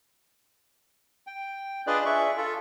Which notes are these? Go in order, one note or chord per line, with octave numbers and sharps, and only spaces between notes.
G5
D4 F4 G#4 B4 D5 D#5
G#4 E5 C#6
F4 A4